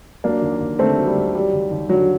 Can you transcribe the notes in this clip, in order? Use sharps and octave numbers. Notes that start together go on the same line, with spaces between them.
F#3 A#3 D4
D#2
D#2
D3 A3 C4
F#3
G3
D#2
F#3 G3
D#2
D#2
D3 F#3